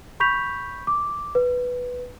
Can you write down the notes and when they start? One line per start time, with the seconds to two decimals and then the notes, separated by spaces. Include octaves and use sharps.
0.20 B5 C#6 G6 B6 F7
0.87 D6
1.35 B4